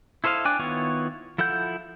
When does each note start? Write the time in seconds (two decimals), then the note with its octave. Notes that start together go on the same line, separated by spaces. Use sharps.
0.24 E4 A4 C5 D#5 F5
0.45 D4 G5 G#5 D6 F#6
0.59 D#3 B3 E4 F4 C#5
1.38 F3 E4 A4 F#5 G6